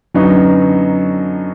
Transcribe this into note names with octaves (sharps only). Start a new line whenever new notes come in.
F#2 D3 F#3 B3 D#4